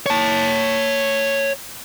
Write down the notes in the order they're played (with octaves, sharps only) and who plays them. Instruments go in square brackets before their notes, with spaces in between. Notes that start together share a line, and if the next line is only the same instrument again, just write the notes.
[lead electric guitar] C#5 A5